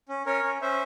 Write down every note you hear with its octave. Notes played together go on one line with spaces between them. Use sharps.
C#4
C#4 A#4 C#5
C#4
C#4 C5 E5